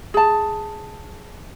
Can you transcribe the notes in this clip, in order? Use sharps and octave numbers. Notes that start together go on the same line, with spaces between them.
G#4 A5